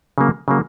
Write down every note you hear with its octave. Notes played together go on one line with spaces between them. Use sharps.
C#3 F#3 A#3
C#3 F#3 A#3